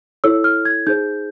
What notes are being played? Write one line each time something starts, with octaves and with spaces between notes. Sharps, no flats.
E4 A4 C#5 E6
F6
G#6
D#4 G#4 C5 G6